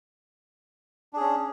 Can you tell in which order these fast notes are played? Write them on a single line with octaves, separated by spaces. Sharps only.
D4 G#4 C#4